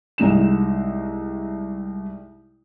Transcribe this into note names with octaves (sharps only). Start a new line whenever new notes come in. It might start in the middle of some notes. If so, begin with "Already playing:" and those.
C2 G#3 D#4 E7